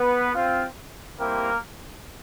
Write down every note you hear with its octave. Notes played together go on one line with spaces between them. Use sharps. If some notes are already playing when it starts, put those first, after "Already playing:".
Already playing: B3 B4
C4 F4
G3 A#3 C4 E4 G4 A#4